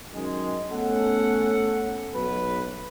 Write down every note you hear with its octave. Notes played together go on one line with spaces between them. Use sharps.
F#2 D#3 G#3
A3 B3 C#4 A4 F#5
B1 B4